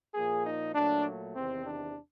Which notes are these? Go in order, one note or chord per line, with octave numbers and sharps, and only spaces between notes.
A#2 F3 A#3 G#4
D#4
A#2 F#3 A3 D4
E2 C3 D#3 C4
D4